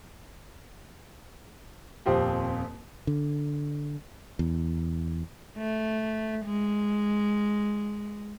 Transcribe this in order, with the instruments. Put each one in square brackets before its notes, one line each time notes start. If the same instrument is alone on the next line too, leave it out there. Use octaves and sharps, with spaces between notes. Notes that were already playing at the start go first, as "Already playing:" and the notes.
[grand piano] D#1 F2 C4 F4 G4
[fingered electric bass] D3
E2
[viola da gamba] A3
G#3